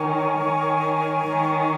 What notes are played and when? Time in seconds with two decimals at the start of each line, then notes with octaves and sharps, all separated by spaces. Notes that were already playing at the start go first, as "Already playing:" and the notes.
Already playing: D#3 A#4 C#5 G#5 C#6
0.38 D#3
1.26 D#3